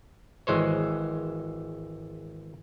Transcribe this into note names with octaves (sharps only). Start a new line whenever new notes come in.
G#1 E3 G#3 C5 C#5